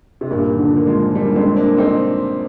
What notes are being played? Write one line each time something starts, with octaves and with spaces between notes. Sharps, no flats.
C3
G2 A#2
D#3
D3 F3
A#3
F3 G#3
G3 A#3
D4
G#3 C4
A#3 D4
C4 D#4